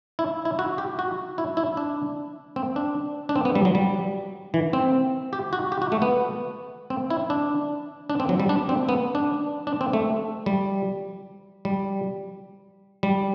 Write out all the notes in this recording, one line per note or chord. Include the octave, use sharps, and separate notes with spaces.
E4
E4
F#4
G4
F#4
E4
E4
D4
C4
D4
D4
C4
B3
G3
F#3
G3
E3
C4
G4
F#4
G4
F#4
A3
B3
C4
E4
D4
D4
C4
F#3
G3
D4
C4
B3
D4
D4
C4
A3
G3
G3
G3